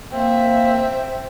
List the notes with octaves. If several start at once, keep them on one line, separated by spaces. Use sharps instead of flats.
A#3 C4 E5